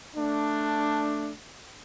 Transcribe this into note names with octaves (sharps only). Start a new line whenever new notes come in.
A3 D4